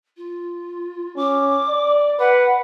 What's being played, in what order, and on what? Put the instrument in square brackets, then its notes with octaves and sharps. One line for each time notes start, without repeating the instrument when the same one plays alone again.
[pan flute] F4
[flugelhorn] C#4 [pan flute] D6
[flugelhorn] D5
[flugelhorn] B4 [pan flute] F#5